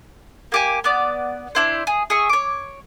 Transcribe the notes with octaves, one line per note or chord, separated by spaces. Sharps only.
A#3 G4 G#5
B3 D5
D4 E4 C5
G#4
G#4 E5 C#6
C#5 D6